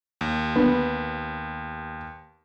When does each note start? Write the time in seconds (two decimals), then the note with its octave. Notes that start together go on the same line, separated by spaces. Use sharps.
0.21 D#2
0.56 B3